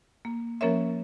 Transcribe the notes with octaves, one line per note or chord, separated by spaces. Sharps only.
A#3
F3 A#3 C#4 A#4 C#5 E5